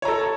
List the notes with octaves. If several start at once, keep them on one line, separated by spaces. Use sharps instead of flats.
A4 C#5 A#5